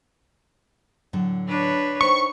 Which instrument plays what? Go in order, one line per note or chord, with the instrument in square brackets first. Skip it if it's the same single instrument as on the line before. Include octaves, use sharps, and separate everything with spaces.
[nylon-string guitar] A2 D3 F#3
[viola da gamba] D4 B4 C#5
[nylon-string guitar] D#4 C5 G5 [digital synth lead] C#6